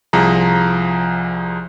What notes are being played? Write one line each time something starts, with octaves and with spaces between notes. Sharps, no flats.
C2 F3 G#4 A#5